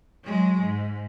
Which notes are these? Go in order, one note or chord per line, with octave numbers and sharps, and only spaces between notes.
F#3 G#3
G#2